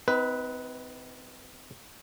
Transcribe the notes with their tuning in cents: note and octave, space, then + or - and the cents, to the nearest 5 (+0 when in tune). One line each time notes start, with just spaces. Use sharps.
C4 -35 D#4 +30 B4 +0